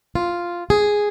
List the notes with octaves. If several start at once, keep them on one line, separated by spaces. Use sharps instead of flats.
F4
G#4